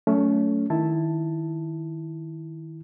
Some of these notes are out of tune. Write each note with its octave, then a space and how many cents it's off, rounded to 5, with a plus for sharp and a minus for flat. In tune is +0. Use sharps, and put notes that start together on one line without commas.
F#3 +0 A3 +0 C#4 +25
D#3 +10 E4 +0 A5 +0